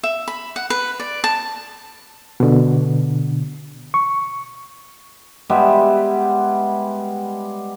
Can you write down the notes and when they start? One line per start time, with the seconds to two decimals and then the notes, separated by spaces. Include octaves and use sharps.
0.03 E5
0.28 B5
0.56 F#5
0.70 B4
1.00 D5
1.24 A5
2.40 B2 D3
3.94 C#6
5.50 G3 G#3 B3 E5